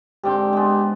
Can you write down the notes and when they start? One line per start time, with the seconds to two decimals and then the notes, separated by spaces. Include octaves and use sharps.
0.23 G#2 D3 C4 G4
0.53 G#3 B3